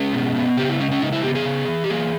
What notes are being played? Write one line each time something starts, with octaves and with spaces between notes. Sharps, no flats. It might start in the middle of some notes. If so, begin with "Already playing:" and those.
Already playing: G#3 C#4
B2
B3
C#3 G4
E4
G#3 C#4
C#4
C#3 D#4
E4
B3 G4
G#4
C#3
E3
G4
A#3 G#4